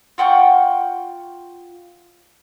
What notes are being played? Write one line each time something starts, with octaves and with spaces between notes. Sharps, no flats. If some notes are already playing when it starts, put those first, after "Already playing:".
F4 F#5 G5 C#6